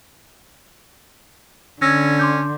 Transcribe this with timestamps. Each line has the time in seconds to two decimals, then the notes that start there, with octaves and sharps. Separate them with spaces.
1.82 D3 C#4 E6 G#6 A#6
2.19 C6 D6 G6